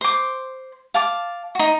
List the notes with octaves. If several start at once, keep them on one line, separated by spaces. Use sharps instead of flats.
C5 D6
F5 A5 D6
D#4 F#4